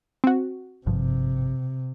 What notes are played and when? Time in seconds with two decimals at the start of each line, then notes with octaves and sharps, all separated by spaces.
0.24 C4 F#4
0.86 G#1 G2 C3 F3